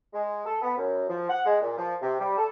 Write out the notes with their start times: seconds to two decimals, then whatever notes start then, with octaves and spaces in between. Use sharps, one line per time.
0.13 G#3
0.46 A4
0.62 B3
0.77 F#2
1.09 F3
1.30 F#5
1.46 G#3
1.61 A#2
1.78 F3
2.02 C3
2.20 G3
2.38 A4